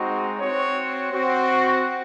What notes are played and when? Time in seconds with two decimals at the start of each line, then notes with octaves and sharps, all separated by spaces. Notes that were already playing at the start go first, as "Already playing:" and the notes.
Already playing: G#3 C4 D#4 F#4
0.38 C4 F#4 C#5
1.12 C4 F#4